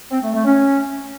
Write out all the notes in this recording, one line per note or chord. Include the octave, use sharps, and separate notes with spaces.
C4
A3
A3
C#4